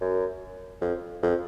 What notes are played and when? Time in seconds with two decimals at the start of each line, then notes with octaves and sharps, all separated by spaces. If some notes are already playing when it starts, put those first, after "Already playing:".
0.01 F#2
0.81 F2
1.22 F2